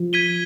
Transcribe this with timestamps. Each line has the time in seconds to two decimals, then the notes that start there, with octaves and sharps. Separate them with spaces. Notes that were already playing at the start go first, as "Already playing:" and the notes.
Already playing: F3
0.13 G#6 B6 D#7 G7